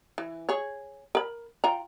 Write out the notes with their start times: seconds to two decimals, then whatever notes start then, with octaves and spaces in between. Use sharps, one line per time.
0.18 E3
0.49 G#4 C#5
1.15 A#4 B5
1.64 F4 G5 A#5